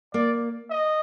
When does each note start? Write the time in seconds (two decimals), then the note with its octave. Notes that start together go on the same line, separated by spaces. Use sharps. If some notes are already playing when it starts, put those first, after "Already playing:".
0.14 A#3 D5
0.70 D#5